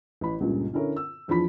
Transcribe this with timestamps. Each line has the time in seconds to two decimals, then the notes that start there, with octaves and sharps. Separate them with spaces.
0.21 A1 B5
0.40 C#2 G2 A#2 C#3
0.73 D3 C#4 E4 A4 A#4 C#5
0.96 E6
1.28 E2 F3 D4 F4 B5 B6